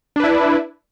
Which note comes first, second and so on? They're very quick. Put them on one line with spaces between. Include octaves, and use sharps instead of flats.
D4 B4 E4